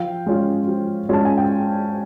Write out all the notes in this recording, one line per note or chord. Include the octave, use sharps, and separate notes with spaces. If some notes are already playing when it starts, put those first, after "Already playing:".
Already playing: F3 F5 G5
G#3 C#4 F4
F3
G#3 C#4 F4 A5
G#5
G5